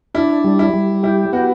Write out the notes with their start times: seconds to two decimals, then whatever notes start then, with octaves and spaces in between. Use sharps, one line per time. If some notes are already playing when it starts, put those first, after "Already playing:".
0.15 D4 E4
0.44 G3
0.59 E4
0.73 G3
1.03 E4 G4
1.33 B3 F#4